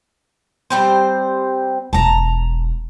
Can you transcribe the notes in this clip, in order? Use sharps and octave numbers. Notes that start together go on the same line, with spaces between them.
G3 C4 C5
E1 E4 A5 A#5